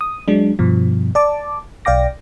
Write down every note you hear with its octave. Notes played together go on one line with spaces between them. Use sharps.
D#6
F#3 G#3 D4
G2 B2 F3
D5 A5 D6
B1 D5 F5 G5 D6 A#6